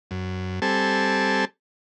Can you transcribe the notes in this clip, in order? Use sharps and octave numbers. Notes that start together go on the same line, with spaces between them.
F#2
G3 C4 A4 G#5 A5